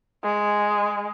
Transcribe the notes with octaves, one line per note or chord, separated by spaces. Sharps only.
G#3